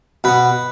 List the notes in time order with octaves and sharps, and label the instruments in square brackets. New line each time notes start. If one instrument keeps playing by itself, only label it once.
[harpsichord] B2 B3 B4